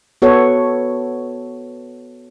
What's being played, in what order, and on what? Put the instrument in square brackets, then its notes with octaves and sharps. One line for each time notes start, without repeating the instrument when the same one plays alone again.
[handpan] B3 F#4 A4 C#5